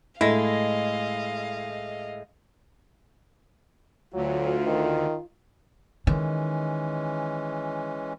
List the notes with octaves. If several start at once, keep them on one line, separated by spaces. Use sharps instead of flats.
A2 G#3 A3 E4 D#5 F5 A#6
D2 F#3 F4
D#3
D#3 E3 G#3 C#4